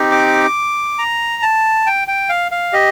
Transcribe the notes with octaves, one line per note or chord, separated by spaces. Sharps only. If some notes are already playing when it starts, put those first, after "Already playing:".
Already playing: C4 D#4 G4
D6
A#5
A5
G5
G5
F5
F5
G4 D#5